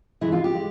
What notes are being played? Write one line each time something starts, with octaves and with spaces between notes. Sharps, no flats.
C3 E3 G#3 E4
F4
G4
G#3